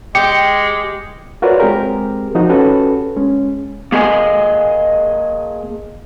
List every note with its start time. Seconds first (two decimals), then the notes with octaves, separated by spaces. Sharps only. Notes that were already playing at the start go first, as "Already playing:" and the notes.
0.15 G#3 G4 C#7
1.42 F4 F#4 A#4 B4 C#5 D5
1.60 G#3 C4 G4 G#4 A#4
2.35 F3 D#4 F#4
2.49 C#4 F#4 G4 A4 B4
3.16 G#3 C#4
3.92 A#3 G#4 D#5 G#5